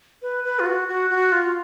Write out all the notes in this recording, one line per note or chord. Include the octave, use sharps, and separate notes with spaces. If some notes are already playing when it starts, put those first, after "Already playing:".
B4
B4
F4
F#4
F#4
F#4
F4